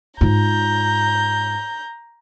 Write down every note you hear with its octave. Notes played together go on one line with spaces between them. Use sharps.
G#2 F4 A#5 G6